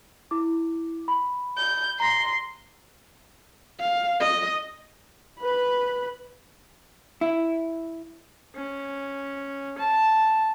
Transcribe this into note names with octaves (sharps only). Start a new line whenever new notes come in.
E4 D6
B5
G6
A#5 C6 A#6
F5
D#5
B4 B5
E4
C#4
A5